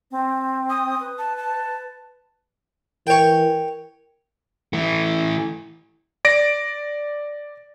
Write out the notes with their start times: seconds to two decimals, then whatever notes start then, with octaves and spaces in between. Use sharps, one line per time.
0.11 C4
0.70 D#6
1.00 B4
1.19 A5
1.37 A5
3.07 E3 A#4 C#5 G5
4.73 E3 A3
6.25 D5 A#6 D7